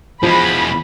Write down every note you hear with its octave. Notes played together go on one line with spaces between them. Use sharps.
E2 F3 G#3 B5